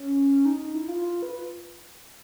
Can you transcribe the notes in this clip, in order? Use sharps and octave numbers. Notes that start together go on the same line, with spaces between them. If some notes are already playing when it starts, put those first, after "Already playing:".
Already playing: C#4
D#4
E4
F4
B4